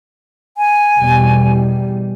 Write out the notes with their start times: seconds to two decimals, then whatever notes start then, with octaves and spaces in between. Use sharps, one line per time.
0.57 G#5
0.97 E2 B2 G3